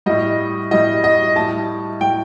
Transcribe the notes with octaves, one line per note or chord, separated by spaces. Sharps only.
A2 G3 D#5
A2 G3 D#5
D#5
A2 G3 A5
A2 G3 G5